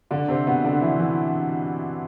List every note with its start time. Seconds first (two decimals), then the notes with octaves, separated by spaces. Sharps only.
0.11 D3 D4
0.28 C3 C4
0.47 B2 B3
0.64 D3 D4
0.81 E3 E4
0.99 E3 E4